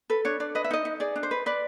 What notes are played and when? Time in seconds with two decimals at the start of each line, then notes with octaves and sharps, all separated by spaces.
0.10 A4 B4
0.25 D4 C#5
0.40 D4 D5
0.55 B4 D#5
0.64 E5
0.71 D#4 D#5
0.85 D#4
1.00 G#4 D5
1.16 D4
1.23 C5
1.31 B4
1.46 B4 D5